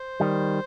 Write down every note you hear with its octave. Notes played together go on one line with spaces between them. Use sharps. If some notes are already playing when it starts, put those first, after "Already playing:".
Already playing: C5
D#3 G3